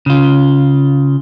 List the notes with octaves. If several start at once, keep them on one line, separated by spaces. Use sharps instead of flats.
C#3 F4